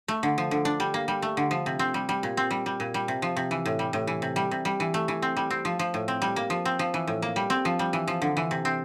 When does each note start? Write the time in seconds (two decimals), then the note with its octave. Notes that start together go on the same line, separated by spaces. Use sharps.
0.08 A3
0.23 D3
0.38 F3
0.51 D3
0.65 D4
0.80 G3
0.94 A#3
1.08 G3
1.22 A3
1.37 D3
1.51 F3
1.66 C3
1.79 C4
1.94 G3
2.09 G3
2.23 A#2
2.37 C4
2.51 G3
2.66 G3
2.80 A#2
2.94 G3
3.08 C3
3.22 F3
3.36 C3
3.51 E3
3.66 A2
3.79 G3
3.93 A2
4.07 E3
4.22 C3
4.36 G3
4.51 C3
4.65 G3
4.80 E3
4.94 A3
5.08 E3
5.22 C4
5.37 G3
5.50 C4
5.65 F3
5.79 F3
5.94 A2
6.08 C4
6.22 G3
6.36 A#3
6.50 F3
6.65 C4
6.79 F3
6.94 E3
7.07 A2
7.22 A#3
7.36 G3
7.50 C4
7.65 F3
7.79 G3
7.93 E3
8.08 F3
8.22 D3
8.37 E3
8.51 C3
8.65 C4